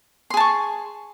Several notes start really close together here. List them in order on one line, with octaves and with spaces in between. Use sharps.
C6 G#4 A5 C#6